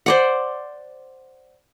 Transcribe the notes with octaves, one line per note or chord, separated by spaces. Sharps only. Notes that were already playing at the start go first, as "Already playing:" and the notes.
C5 D5 F#5